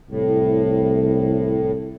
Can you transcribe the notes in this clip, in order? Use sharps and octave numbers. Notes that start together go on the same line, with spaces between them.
C2 A2